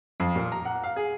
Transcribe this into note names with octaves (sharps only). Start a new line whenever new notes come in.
F2
A#2
A#5
F#5
F5
G#4